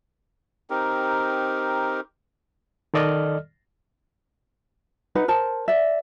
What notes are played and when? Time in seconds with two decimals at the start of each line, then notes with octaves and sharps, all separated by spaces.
0.70 C4 D#4 G4 A#4
2.94 D#3 A4 D5 D#5 F6
5.15 D#4 B4 F#5
5.28 A#4 C5 A5
5.68 D5 E5